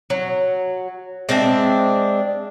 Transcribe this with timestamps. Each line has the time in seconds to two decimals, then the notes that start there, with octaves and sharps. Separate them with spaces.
0.10 F#3
1.29 G#3 C4 D4 E5